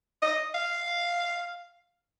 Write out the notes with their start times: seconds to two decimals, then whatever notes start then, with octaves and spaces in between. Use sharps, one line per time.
0.22 D#5
0.54 F5